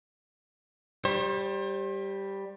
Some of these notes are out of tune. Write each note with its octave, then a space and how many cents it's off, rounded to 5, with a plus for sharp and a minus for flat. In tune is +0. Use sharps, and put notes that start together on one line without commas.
G3 +0 C5 +35